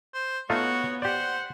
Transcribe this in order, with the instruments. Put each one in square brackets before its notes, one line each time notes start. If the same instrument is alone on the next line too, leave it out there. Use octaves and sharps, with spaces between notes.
[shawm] C5
[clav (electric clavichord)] A3 D#4 F4 [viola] B3 C#5 [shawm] F#4
[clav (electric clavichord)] G4 D5 [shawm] C5 [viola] F#5